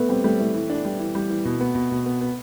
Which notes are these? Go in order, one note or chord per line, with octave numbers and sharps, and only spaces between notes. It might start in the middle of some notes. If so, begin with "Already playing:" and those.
Already playing: A3 B3
G3 C4
G3 A3
E3 A3
E3
D4
G3
E3
G3
E3
B2
B3
B2
B2
B3
B3